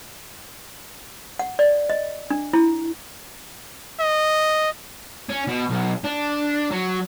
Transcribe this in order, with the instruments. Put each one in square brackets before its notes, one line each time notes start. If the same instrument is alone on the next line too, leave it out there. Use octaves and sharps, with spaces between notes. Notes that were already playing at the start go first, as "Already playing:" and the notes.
[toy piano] F#5
D5
D#5
D4
E4
[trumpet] D#5
[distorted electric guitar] C#4
B2
B1
D4
F#3